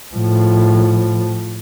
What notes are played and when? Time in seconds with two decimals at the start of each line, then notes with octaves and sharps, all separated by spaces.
0.15 A2 F3